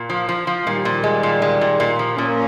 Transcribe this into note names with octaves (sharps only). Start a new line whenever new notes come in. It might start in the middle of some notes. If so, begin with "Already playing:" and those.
Already playing: A#2
F3
F3
F3
A#2 D#3 G3
A#2
G#3
A#2
G#3
A#2
A#2
F3
A#2 A#3 C#4